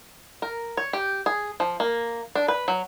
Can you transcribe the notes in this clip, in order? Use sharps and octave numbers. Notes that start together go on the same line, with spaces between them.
A#4
C#5
G4
G#4
F3
A#3
D4
B4
F#3